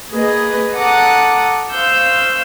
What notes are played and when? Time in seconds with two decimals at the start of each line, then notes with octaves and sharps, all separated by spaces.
0.10 A#3 G#4 B4 D#5
0.76 A4 F#5 A#5 D6 D#6 F#6
1.70 C5 F5 C#6 E6 G6